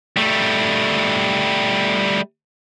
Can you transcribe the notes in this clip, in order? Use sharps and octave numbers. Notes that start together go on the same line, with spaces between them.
G3 A3